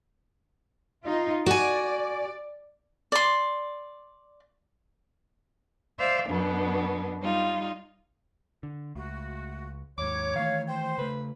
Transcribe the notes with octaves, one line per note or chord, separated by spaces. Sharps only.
D#4 F4
F#4 D5 G#5
D5 C6
C5 D5 E5 F5
F#2 B2 B3 D4
G3 D#4 F4
D3
C#2 A3 F#4
D#2 G#2 C#5 D6
D#3 E3 A3 F5
C5 G5
C#3 A3 B4